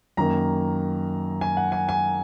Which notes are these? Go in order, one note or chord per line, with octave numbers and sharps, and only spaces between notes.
F#2 D#3 A#3 A#5
G#5
F#5
G#5
G#5